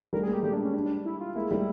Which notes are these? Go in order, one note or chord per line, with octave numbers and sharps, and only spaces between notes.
G3 A3 A#4
G#4
G#3 A#3
G4
G3 A3 G4
D4
C#4
D4
D4
E4
F4
G#3 A#3 E4
G3 A3